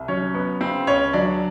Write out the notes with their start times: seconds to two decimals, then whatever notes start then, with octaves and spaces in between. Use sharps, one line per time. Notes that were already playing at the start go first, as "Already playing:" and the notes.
Already playing: C2
0.08 F#3 C#4 C#5
0.34 B3
0.61 C#3 C4 C5
0.87 C#2 C#4 C#5
1.13 F#3 D4 D5